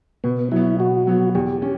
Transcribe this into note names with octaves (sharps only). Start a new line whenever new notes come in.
B2 B3
F#3 B3 E4
B2 F#4
F#3 B3
E2 G4
C#4 G4